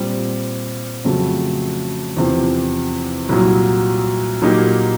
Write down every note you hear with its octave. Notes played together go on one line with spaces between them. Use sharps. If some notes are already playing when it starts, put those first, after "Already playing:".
Already playing: A#2 G3 C4
F2 C#3 F#3 A3
E2 C3 F3
C2 A#2 F#3
A#2 F#3 A#3 D#4 G4